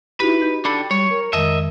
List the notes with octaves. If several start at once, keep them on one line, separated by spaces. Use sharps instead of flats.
D#4 E4 F#4 G4 B4
D#4 G6
D4 A4 G5 B5
G3 C#5
A#4
F2 D#3 G#3 A#4 D#5 E5